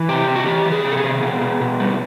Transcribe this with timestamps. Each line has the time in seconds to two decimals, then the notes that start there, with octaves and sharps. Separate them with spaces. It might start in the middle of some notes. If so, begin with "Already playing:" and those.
Already playing: E3
0.09 C3 G4
0.27 C3
0.36 F#4
0.46 E3 G4
0.66 E3
0.72 G#4
0.84 C3
0.92 A4
0.97 G#4
1.04 C3
1.23 B2
1.41 B2
1.61 B2
1.80 G3